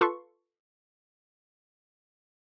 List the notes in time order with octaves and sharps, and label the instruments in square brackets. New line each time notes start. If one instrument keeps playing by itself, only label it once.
[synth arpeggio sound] F4 A4 B4 C6 C#6